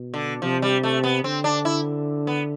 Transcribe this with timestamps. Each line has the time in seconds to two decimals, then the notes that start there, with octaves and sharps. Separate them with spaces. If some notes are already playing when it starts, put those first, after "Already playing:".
Already playing: B2
0.14 D3
0.42 C3 F3
0.62 G3
0.83 A3
1.04 B3
1.24 D3 C4
1.44 D4
1.65 E4
2.27 B3